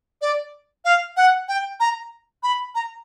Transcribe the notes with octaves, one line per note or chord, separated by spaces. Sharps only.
D5
F5
F#5
G5
A#5
B5
A#5